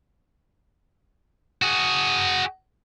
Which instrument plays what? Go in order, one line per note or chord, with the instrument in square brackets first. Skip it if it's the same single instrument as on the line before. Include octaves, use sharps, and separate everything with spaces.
[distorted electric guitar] F#4 G#4